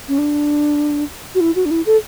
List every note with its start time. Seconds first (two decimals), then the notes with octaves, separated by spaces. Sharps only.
0.08 C#4
0.18 D4
1.35 F#4
1.40 E4
1.55 F#4
1.65 D4
1.71 E4
1.86 A4